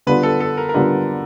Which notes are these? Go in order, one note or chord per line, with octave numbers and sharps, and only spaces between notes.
D3 G3 B3 D4 F4 B4
A4
A4
A#4
A#4
D3 G3 B3 D4 F4 B4